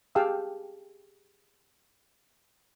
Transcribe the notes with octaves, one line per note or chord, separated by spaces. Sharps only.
G4 G#4 F5 G5 A5 E6